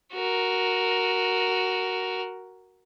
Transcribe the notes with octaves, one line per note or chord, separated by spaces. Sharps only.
F#4 A#4